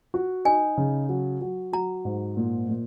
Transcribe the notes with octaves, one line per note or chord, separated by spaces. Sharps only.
F#4
D#4 G#5
C#3
F#3
F#3
F#3 A#5
G#2
A#2
A#2